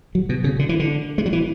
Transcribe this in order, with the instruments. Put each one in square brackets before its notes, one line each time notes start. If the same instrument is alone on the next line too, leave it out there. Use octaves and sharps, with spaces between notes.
[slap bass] F#3
B2
C#3
D3
E3
D3
G#3
F#3
E3